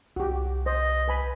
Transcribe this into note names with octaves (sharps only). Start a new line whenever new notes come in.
C2 F#4 G4
C5 D#5
B4 G#5 B5